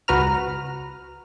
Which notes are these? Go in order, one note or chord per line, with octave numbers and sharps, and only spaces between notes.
C#2 F#4 B4 A#5 F6